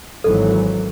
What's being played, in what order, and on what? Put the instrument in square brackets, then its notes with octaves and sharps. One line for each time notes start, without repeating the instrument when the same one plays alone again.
[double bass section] G#1 E3 F#3 [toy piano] A4